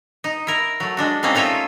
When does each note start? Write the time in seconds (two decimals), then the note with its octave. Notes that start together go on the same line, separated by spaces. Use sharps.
0.24 D#4
0.47 E4 A#4
0.80 F#3 A3
0.97 G#3 D4 F#4
1.23 G3 A#3 C4 C#4 D#4
1.35 A3 D#4 F4 C#5 E5